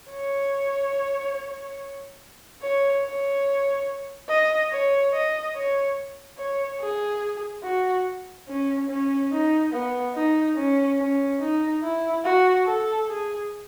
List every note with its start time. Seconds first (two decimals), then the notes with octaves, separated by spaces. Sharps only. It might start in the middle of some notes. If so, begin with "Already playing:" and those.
0.11 C#5
2.62 C#5
3.03 C#5
4.28 D#5
4.71 C#5
5.13 D#5
5.55 C#5
6.38 C#5
6.80 G#4
7.63 F#4
8.48 C#4
8.89 C#4
9.32 D#4
9.72 B3
10.15 D#4
10.56 C#4
10.98 C#4
11.40 D#4
11.83 E4
12.24 F#4
12.66 A4
13.08 G#4